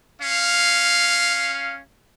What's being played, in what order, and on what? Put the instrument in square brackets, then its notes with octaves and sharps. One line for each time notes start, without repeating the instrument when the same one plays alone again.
[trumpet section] C#4 F5